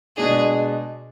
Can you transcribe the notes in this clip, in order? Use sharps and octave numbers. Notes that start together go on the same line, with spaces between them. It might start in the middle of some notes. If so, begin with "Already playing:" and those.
B2 G#3 D4 G#4